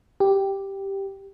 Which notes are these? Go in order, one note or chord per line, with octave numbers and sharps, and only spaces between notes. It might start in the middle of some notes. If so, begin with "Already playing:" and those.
G4